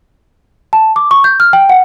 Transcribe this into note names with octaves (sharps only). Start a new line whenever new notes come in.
A5
D6
C#6
G6
F6
G5
F#5